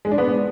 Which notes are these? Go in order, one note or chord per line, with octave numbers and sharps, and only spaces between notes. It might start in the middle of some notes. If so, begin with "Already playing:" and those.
G#3
D4
B3